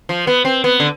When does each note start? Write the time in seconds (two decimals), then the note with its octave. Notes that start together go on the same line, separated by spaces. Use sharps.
0.09 F3
0.27 B3
0.45 C4
0.64 B3
0.80 D3